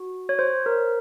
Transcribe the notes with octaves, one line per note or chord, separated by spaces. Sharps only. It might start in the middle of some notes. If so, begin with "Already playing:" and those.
Already playing: F#4
C#5
C5
A#4